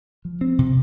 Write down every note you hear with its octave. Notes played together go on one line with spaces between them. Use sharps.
F3
C4
C3